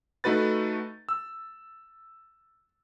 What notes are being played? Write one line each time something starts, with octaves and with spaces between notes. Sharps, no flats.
A3 D#4 F#4 B4 A6
E6